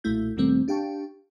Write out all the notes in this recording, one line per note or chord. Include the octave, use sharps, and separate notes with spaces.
B1 A#2 A3 E4 G6
D#2 B2 D#3 G3 A3 C4
D4 G4 F5 G5 A5 C#6